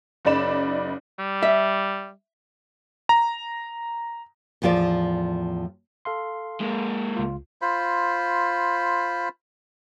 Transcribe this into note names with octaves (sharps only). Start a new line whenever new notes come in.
F#1 F#2 D#4 D5 B5 E7
G3
E5
A#5
E2 A2 F3 F4 D5
A4 F5 C6
G#3 A#3
C#2 F4
F4 C5 B5